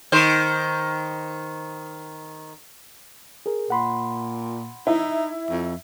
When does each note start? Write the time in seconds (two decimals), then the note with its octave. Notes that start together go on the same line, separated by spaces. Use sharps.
0.12 D#3 C5
3.46 G#4 A#4
3.70 A#2 F#5 B5 C6
4.87 D#4 E4
5.50 F2